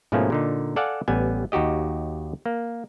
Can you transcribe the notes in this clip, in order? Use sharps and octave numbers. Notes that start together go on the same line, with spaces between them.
G#2 B2 F3 A3 A#3 C#4
A#2 D3 D#4
A4 D5 F5 F#5 G#5 A5
A1 G3 B3 G#5
D#2 D#4 F#4 G4 D#5
A#3